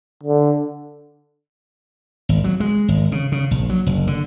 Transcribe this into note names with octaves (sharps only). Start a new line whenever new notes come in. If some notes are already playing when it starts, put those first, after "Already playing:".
D3
G#1
F#3
G#3
G#1
C#3
C#3
A#1
F#3
F#1
D3